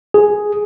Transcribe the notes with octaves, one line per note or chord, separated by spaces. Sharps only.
G#4